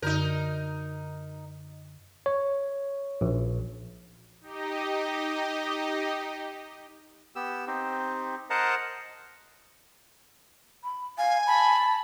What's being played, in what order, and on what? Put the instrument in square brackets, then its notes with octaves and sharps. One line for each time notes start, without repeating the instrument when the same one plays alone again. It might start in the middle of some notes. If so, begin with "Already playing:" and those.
[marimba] F#2 D3 G6 [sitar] D#4 A#4
[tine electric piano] C#5
A#1
[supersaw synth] D#4 G4 D#5
[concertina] B3 G4 E6
C4 D#4 G4
A#4 C5 D#5 F#5 A5 A#5
[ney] B5
[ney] F5 [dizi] G#5
[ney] A5 [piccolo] B5